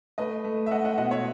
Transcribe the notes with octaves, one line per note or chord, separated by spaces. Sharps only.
A3 B4 D#5
A3
E5
A3 D#5 F#5
D#5 F#5
B2 D#5 F#5
C#5 E5